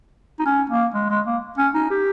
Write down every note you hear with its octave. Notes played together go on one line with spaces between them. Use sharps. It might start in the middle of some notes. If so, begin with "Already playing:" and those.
D#4
C#4
A#3
G#3
G#3
A#3
C#4
D#4
G4